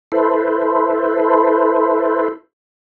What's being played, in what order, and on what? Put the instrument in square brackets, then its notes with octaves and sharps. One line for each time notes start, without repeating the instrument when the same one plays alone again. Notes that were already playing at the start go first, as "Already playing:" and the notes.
[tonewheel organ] E4 A4 B4 C5